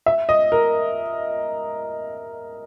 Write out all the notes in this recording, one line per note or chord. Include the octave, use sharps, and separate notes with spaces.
E5
D#5
A#4